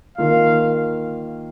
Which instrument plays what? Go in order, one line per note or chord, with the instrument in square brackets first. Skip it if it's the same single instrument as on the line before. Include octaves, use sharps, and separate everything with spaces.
[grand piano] D#3 A#3 F4 [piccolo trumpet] F5